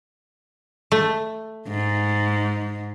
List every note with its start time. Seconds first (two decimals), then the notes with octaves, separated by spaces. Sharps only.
0.92 A3
1.68 G#2